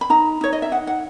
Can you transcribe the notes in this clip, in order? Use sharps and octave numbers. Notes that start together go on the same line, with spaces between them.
B5
D#4 A#5
D#4 C#5
D#5
E5
D#4 F#5
F#5